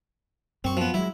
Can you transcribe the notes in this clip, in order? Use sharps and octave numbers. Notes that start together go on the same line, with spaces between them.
F#2 C4 C#6
F3 B3
F#3 G#3 E4